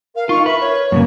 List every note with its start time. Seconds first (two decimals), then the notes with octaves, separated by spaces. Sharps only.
0.15 A#4 F5
0.29 D#4 F4 C#6
0.46 A#4 B4 E5
0.60 C#5
0.92 F#2 A2 C#3 A#3